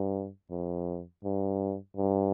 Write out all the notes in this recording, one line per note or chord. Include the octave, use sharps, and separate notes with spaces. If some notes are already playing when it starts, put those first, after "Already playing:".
Already playing: G2
F2
G2
G2